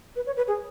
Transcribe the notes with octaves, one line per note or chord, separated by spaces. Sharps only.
B4
C#5
B4
G#4